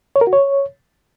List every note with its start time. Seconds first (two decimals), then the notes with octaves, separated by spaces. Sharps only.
0.16 C#5
0.21 A#4
0.27 F#4
0.33 C#5